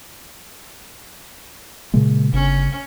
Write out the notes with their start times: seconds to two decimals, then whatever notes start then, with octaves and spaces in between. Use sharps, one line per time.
1.94 A#2 C#3 G#3
2.33 G1 G2 C#3 C#4